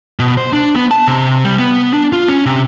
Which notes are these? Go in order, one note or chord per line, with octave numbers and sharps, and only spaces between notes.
B2
C5
D4
B3
A5
C3
G3
B3
D4
F4
C#4
C3